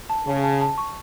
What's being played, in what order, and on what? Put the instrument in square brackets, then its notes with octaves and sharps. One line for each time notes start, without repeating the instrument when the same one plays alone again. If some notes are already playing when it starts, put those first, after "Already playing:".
[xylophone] A5
[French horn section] C#3 [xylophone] A5
[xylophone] A5
A5
C#6